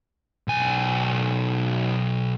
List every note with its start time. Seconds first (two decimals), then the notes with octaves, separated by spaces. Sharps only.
0.48 B1 G#5